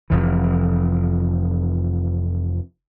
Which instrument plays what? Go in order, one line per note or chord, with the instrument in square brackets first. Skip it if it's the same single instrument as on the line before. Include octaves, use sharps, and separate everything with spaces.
[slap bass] F1 F2 E3